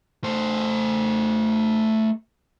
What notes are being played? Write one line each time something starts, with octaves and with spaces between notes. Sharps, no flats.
A3 C5